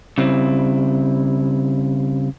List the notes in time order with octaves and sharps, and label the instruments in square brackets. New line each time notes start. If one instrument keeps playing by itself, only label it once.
[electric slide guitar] C#3 G3 C4 E4